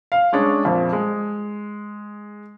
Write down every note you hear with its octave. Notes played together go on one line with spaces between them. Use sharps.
F5
G#3 C#4 D4 G#4 C#5 D5
F2 A#2
G#3